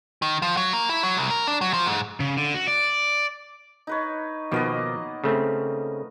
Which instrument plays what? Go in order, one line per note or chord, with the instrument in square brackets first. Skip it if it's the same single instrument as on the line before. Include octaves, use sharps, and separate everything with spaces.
[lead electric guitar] D#3
F3
F#3
A#3
E4
F#3
C2
A#4
D4
F#3
F3
G#2
[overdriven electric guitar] C#3
D3
F#4
D5
[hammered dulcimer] D#4 B4 C#5
[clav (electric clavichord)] B2 D#3 F3 [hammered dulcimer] A#3 B3 D#5
[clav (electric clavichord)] C#3 A3 C4